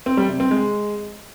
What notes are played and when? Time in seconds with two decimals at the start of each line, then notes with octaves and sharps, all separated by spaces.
0.06 C4
0.17 G3
0.29 C3
0.40 C4
0.51 G#3